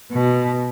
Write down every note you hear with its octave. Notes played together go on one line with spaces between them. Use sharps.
B2